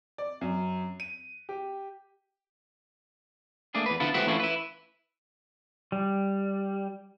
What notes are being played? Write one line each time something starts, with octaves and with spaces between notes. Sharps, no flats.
D5
F#2
D#7
G4
A3 A#3 D4 G#4
E2 B4
D3 B3 E4 F4 A4
G#3 A3 C4 E4 F#4 B4
E3 A3 C#4 E4 F4
E4 B4
G3